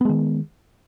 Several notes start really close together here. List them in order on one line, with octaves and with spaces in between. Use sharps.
B3 G#3 D#3